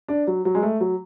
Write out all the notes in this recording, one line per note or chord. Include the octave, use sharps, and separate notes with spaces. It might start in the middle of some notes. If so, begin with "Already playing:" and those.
D4
F#3
F#3
G#3
A3
F#3